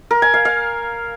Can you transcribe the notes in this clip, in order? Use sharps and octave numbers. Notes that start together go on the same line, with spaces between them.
A#4
G#5
F5
F5